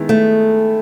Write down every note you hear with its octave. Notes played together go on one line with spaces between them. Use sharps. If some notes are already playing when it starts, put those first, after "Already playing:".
Already playing: D#3 G#3 B3 E4
A3